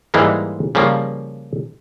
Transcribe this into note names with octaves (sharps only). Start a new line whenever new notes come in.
G#2 E3 G3 G#3 A#3
C#3 F3 G3 A#3